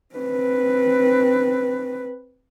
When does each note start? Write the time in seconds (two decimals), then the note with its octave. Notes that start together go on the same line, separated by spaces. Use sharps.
0.15 C4 B4